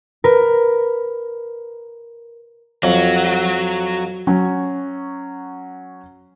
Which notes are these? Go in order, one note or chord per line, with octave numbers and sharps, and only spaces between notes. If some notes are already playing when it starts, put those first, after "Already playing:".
A#4 B4
F2 F#3 F#4
F#3 C#4